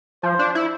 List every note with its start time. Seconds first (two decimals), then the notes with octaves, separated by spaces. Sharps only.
0.23 F3 C5
0.39 D4
0.55 E4